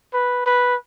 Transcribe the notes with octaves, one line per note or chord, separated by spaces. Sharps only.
B4
B4